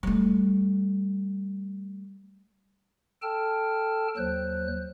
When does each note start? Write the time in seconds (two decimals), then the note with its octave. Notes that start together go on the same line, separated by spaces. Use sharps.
0.03 G3 A3
3.22 A4 G5 A5 F6
4.17 D#2 F#3 C5 F#6